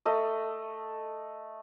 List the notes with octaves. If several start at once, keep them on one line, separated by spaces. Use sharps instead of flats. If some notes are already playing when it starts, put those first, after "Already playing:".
A3 D#5